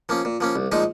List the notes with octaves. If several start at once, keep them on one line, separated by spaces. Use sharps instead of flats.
F3 A#3 C#4
A#2
F3 A#3 C#4
C2
A#2 F3 G#3 D#4